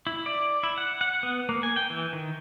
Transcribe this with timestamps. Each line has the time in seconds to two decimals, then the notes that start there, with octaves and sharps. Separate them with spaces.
0.07 E4
0.26 D5
0.63 E4
0.78 F#5
1.01 F#5
1.23 B3
1.49 A#3
1.63 G#5
1.76 G5
1.90 E3
2.13 D#3